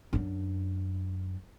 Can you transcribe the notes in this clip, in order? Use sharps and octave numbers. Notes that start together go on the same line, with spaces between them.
F#2 D4